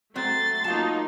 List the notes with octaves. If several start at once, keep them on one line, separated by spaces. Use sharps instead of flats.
F#3 A3 C4 C6 A6
F#3 A#3 D#4 F4 F5 A5